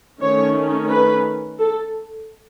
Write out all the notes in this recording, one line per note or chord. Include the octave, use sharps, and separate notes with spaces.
D#3 A3 C#4 C#5
B4
A4